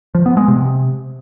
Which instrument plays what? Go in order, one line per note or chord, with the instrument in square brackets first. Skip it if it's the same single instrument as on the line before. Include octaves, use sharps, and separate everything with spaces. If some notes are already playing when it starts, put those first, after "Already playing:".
[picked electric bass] F3
B3
G#3
C3